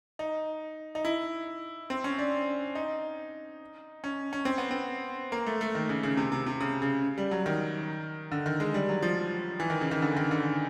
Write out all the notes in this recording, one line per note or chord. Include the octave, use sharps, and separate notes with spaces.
D#4
D#4
E4
C4
C#4
D4
D#4
C#4
C#4
C4
B3
C4
A#3
A3
A3
D#3
C#3
C#3
C3
C3
C3
C#3
C#3
G3
F#3
D#3
D3
D#3
G#3
G3
F#3
F3
E3
D#3
C#3
D#3
D3
D#3
D3